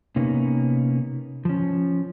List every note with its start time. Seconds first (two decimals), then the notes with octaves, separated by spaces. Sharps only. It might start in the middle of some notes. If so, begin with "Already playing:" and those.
0.16 C3 A#3 B3 C#4 D#4
1.45 F3 C#4